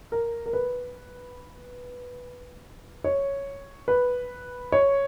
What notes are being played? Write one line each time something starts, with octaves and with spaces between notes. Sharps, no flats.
A#4
A#4
B4
C#5
B4
C#5